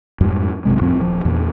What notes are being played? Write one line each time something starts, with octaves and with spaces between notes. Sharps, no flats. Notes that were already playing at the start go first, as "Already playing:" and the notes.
F2 G#2 G3
A#1 F#2 C3 G#3
F2 A2 F3 C4
D#1 F3
E2 A#2